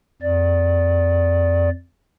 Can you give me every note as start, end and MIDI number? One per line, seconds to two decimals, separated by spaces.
0.22 1.69 41
0.22 1.69 74